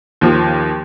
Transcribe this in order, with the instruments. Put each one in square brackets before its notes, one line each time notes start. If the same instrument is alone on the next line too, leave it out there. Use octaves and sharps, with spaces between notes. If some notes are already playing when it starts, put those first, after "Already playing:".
[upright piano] D#2 F3